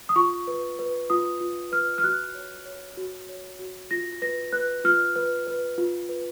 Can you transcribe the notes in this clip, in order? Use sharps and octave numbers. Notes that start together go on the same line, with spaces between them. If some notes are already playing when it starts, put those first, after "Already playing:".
D#6
F4 C#6
B4
B4
F4 D#6
F4
B4 F6
F6
F#4 F#6
C#5
C#5
F#4
C#5
F#4
F4 A#6
B4 A#6
B4 F#6
F4 F6
B4
B4
F4
B4